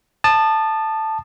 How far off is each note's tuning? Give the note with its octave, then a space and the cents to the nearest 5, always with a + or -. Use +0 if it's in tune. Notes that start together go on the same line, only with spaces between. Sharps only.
A5 +0 D#6 -35